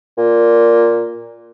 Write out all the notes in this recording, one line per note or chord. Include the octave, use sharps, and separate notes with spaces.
A#2